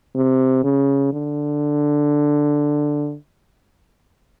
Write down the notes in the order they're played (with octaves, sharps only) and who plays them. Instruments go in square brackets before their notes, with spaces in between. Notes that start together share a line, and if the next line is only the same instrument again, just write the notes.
[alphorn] C3
C#3
D3